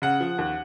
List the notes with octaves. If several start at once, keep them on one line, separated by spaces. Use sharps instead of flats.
C#3 F#5
F3
D#2